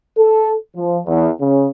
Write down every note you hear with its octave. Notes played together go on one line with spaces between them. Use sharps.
A4
F3
E2
C#3